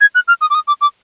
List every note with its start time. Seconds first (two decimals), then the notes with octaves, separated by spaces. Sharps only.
0.01 G#6
0.15 F#6
0.28 F6
0.41 D#6
0.50 D6
0.55 D#6
0.68 D6
0.81 D6